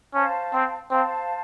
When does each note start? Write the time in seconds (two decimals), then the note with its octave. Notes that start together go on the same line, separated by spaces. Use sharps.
0.14 C#4 C5 F5 A5
0.53 C4
0.91 C4 C5 F5 A5